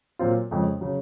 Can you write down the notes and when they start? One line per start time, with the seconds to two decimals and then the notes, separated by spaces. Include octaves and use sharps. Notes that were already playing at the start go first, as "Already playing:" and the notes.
0.19 A#2 F#3 C4 F4
0.51 F2 C#3 G#3
0.81 C#3 F#3